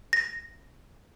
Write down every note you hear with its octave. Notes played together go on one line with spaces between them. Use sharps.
A#6